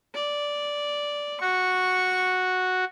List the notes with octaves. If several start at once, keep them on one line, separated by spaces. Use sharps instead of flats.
D5
F#4 C#6